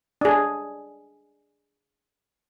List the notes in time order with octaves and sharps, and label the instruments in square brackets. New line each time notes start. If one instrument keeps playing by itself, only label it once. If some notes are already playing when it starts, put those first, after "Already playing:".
[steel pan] D4 G#4